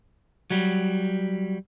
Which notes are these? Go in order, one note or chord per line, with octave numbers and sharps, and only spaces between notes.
F#3 G3